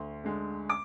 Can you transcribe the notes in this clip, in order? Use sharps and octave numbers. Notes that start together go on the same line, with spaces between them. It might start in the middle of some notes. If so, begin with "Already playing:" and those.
Already playing: D2 C6
D3 G#3
D6